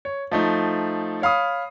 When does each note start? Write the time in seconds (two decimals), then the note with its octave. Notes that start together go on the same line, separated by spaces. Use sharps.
0.05 C#5
0.32 F3 A3 D#4
1.22 C#5 F5 B5 D#6